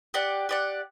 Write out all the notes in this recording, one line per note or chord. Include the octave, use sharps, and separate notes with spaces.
G4 D5 F#5
G4 D5 F#5